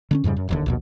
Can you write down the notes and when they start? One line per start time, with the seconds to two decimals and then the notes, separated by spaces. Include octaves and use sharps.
0.11 D3 B3 C#4
0.24 F2 G#2 C#3 G3
0.37 F#2
0.49 D#1 D#2 D3
0.66 A#1 D#2 B2